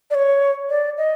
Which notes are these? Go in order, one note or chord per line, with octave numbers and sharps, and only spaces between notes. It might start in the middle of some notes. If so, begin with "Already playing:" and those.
D5
C#5
D5
D#5